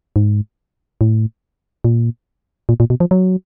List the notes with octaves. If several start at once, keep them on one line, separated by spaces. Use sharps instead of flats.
G#2
A2
A#2
A#2
A#2
B2
F3
F#3